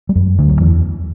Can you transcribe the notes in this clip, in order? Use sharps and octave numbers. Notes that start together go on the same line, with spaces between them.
G3
F#2 F#3
D2 D3
F#3
E2 E3